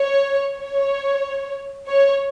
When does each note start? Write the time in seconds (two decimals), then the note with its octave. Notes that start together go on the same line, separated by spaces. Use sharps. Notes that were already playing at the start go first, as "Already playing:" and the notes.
Already playing: C#5
0.57 C#5
1.88 C#5